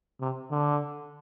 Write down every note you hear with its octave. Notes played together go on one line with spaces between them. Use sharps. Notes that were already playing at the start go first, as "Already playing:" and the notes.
C3
D3